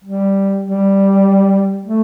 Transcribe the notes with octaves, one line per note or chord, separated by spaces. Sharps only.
G3
G3
A3